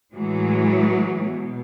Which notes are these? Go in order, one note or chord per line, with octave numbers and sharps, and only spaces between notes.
A2 E3 F#3 G#3
B2